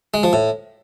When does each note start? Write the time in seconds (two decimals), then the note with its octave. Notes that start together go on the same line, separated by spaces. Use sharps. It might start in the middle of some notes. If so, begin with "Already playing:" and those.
0.14 G#3
0.23 F3
0.33 A2